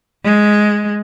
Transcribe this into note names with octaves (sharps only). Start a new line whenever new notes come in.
G#3